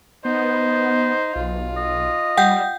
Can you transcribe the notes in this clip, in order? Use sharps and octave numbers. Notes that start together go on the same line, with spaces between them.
B3 D#4 C5
B1 F4
D#5
G3 F#5 G5 G6